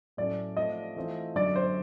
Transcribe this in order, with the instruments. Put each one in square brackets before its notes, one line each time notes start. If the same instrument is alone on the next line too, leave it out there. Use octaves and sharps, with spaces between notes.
[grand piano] A2 F#3 A3 C#4 [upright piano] D5
[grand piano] F3 A3 C4 F4 [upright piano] D#5
[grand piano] E3 A3 C4 F4
[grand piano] F#2 D3 F#3 [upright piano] D5
[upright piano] C5